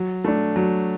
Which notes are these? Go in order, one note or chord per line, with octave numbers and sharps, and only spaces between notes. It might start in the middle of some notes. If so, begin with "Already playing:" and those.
Already playing: F#3
A3 D4
F#3